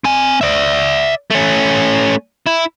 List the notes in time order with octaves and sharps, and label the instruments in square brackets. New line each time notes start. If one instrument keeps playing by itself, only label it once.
[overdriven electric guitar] C4 G#5
D5 E5
A3 C#4
E4